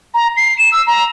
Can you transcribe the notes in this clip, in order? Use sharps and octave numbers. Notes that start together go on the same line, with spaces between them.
A#5
C7
E7
E6
A#5